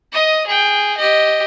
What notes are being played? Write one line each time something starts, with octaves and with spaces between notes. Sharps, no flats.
D#5 D#6
G#4 G5
G4 D#5